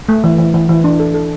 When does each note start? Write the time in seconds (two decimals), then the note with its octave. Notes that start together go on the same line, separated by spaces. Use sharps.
0.09 A3
0.24 E3
0.38 E3
0.54 E3
0.69 E3
0.84 D4
1.00 A4
1.14 A4